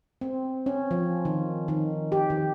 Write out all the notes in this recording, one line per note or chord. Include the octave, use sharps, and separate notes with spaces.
C4
C#4
F3
D#3
D#3
G4
D#3